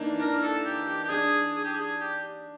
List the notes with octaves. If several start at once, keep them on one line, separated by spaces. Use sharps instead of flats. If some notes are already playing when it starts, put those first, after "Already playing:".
Already playing: E3 A#3 D4 D#4
D4 A#4
A4
G4
G4
G4
D4 G#4
G#4
G4
G#4
G4